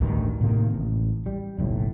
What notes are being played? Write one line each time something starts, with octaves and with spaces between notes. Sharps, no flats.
A1 D2 G2 D#3
A2 C3 D#3 A#3
A1
G3
F#1 B1 A2